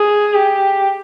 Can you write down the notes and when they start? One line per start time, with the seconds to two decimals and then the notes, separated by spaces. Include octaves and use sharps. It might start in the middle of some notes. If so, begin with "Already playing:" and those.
Already playing: G#4
0.34 G4